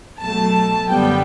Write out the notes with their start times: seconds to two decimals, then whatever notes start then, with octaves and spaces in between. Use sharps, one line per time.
0.20 B2 F#3 A3 A5
0.88 F#2 D3 G3 B3 G5